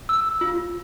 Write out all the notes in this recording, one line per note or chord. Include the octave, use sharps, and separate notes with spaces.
E6
F4